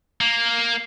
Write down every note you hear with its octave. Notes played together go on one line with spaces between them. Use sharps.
A#3